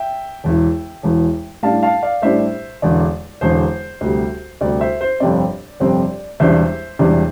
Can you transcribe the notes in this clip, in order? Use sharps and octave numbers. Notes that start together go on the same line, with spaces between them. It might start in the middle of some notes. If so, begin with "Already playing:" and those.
Already playing: E5 G5
E1 E2 E3
E1 E2 E3
A2 G3 D4 F5 A5
F5 A5
D5 F5
A2 G3 D4 C5 E5
E1 E2 D3 D5
E1 E2 D3 C5
D2 C3 G3
D2 C3 G3 D5
C5 E5
C5
G1 F2 C3 G3 C4 D5
G1 F2 C3 G3 C4
E1 E2 C3 G3 D4 C5 E5
E1 E2 C3 G3 D4